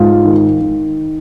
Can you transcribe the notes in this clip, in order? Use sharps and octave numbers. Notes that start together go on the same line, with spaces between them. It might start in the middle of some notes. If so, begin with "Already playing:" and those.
Already playing: G#2 F4
D#3
D#3